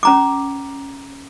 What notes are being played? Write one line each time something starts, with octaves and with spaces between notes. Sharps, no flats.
C#4 A#5 D6